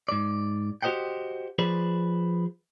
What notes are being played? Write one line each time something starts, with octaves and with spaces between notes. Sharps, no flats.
G#2 D5
F#4 G4 C5 D#5 F#5 G5
F3 G#4 B4 C5 D5